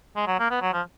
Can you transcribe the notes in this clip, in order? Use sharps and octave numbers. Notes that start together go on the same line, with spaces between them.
G#3
F#3
A#3
B3
F#3
F3